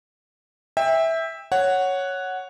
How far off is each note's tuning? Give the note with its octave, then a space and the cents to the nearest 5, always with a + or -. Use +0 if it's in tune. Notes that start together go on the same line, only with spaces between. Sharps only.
E5 -10 G5 +25
C#5 +0 F#5 +0